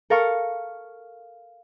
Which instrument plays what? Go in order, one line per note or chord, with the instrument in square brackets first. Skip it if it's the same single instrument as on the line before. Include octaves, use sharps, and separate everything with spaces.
[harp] A4 A#4 F5 C#6